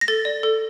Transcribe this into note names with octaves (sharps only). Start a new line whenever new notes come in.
A#6
A4 A6
D5
A4